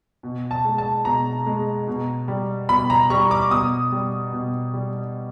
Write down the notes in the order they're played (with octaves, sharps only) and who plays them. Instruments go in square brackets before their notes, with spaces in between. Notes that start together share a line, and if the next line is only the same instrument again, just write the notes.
[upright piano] B2
A5
G#3
A5
B2 A#5
G#3
B2
G3
B2 B5
A#5
G3 C#6
D6
B2 D#6
G3
B2
G3